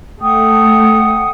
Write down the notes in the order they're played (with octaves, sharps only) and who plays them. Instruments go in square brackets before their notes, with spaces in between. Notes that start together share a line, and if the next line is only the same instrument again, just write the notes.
[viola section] A3 [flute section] F#5 G5 D#6